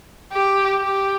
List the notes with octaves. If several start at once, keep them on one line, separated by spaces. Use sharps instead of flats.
G4
G4